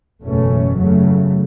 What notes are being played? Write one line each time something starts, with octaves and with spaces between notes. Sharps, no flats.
F#1 E2 B2 A3 C#4
E2 C#3 F#3 A3